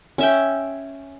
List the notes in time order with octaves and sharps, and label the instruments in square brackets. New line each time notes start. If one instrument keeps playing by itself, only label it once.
[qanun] C#4 E5 G5